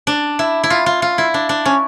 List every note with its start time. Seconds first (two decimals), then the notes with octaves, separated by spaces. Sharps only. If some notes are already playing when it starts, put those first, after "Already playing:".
0.07 D4
0.39 E4
0.64 E4
0.70 F4
0.86 F4
1.02 F4
1.18 E4
1.34 D4
1.49 D4
1.65 C#4